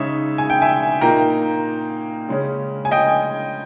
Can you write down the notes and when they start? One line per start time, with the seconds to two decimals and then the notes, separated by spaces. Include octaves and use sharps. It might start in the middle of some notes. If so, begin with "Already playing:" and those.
Already playing: C#3 G#3 D#4 C#5 E5
0.38 G#5
0.50 G5
0.62 E5 G#5
1.01 A#2 A#3 D#4 G5 A#5
2.28 C#3 G#3 C#4
2.85 G#5
2.91 D#5 G5